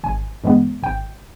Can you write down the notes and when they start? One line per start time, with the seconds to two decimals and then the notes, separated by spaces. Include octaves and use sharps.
0.04 G#1 G#5
0.44 G2 E3 G#3 B3
0.82 G#1 G5